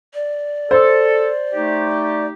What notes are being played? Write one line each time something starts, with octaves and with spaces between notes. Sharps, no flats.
D5
A4 C5
A3 D#4 G4